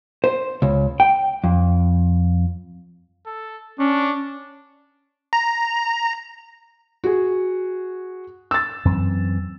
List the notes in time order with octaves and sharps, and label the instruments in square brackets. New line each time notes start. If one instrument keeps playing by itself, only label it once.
[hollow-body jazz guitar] C5
C#2
G5
F2
[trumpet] A4
[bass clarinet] C#4 [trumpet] D4
[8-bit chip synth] A#5
[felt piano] F#4 G#4
E6 A6
[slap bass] F#2 E3 C4